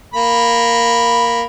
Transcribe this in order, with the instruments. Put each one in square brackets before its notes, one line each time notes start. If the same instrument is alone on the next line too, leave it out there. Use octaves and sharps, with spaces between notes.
[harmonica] A#3 B5